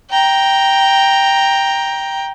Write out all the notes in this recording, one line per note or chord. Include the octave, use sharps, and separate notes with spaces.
G5 A#5